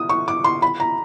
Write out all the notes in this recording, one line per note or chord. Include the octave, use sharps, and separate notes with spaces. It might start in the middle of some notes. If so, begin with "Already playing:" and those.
Already playing: D#6
C#6
D6
C6
B5
A#5